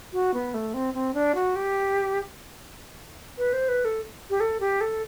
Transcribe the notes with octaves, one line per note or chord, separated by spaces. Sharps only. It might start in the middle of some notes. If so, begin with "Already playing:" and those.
F#4
B3
A3
C4
C4
D4
F#4
G4
B4
C5
B4
A4
G4
A4
G4
A4